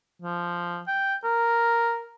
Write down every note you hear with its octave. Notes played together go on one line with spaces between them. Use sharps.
F3
G5
A#4